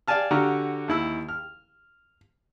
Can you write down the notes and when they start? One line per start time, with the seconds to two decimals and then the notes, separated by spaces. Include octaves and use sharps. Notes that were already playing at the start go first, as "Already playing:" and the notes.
0.08 D5 F5 G#5 A5 F6
0.31 D3 F#4 G4 A#5 F6
0.88 D#2 E4 E6
1.29 F6